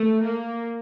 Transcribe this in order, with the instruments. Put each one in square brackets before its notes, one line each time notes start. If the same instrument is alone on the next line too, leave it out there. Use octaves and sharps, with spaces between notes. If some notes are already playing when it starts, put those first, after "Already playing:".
Already playing: [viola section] A3
A#3